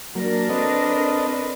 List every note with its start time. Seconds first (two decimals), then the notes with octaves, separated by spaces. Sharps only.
0.15 F#3 A#3 D4 A#4
0.49 C4 A4 B4 D#5